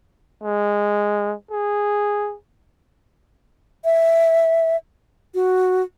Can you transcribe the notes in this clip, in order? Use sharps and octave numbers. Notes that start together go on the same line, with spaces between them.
G#3
G#4
E5
F#4